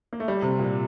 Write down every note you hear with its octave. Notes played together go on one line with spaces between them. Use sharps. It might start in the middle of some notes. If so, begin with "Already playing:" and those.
A#3
A3
G3
C3
A#2